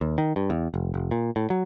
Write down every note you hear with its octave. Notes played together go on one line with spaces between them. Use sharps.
D#2
D#3
G2
E2
F1
F1
A#2
A2
F#3